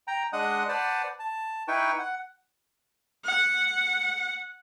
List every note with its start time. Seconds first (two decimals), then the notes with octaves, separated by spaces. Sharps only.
0.07 G5 A#5
0.33 G#3 D4 D#5 F#5 D#6 F#6
0.69 B4 C5 D5 F#5 A5
1.19 A5
1.68 D#4 E4 B4 G5 C#6
1.99 F#5
3.24 F#5